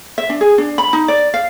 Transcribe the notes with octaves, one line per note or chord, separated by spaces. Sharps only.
E5
D4
G#4
D4
B5
D#4
D5
F5